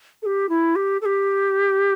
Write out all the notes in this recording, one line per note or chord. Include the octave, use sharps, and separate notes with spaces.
A4
G4
E4
G4
A4
G4